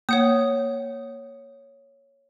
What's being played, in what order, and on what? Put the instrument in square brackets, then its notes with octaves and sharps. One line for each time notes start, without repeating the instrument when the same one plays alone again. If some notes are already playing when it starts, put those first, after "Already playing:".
[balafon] A#3 [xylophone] C#5 F#5 D#6